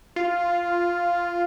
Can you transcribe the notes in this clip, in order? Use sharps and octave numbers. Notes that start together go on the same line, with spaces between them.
F4